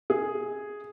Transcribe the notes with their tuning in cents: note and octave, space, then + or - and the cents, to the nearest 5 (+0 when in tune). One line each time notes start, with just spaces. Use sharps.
G#4 +0